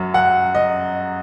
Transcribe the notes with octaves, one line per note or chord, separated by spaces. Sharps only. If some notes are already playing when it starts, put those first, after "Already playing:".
Already playing: F#2 F#3
F#5
D#5